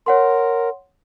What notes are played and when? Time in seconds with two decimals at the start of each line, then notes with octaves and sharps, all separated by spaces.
0.06 A#4 C#5 F#5 C6